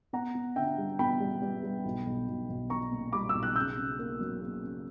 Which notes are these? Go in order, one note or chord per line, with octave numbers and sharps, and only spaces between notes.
B3 F#5 A#5
B3
D3 E5 G5
G3
B3 G5 B5
G3
G3
G3
B1
B1
B1
B1
B1 A#5 C#6
A#2
G3 B5 D6
B1 E6
F#6
C#3 E6 G6
C#3
A#3
F#3
A#3
C#3